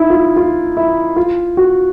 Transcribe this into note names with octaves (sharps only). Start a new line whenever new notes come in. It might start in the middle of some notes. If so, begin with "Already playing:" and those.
Already playing: D#4 E4
F4
F4
E4
F4
F#4